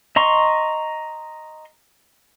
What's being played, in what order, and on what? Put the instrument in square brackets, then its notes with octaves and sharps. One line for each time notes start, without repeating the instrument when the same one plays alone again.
[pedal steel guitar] D#5 A#5 C6 C#6